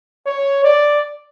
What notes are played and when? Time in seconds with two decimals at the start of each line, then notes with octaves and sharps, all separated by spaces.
0.26 C#5
0.64 D5